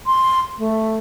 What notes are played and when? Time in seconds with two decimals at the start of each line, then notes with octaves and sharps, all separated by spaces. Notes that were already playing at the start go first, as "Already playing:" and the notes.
0.07 C6
0.58 A3